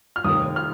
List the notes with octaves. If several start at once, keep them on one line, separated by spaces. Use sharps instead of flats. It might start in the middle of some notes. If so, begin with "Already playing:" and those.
F6
F1 D#2 D#3 D#6
F6